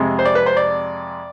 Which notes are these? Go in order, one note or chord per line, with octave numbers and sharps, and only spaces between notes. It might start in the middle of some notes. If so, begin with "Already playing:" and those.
Already playing: F2 C3 G#3
C5
D5
B4
C5
D5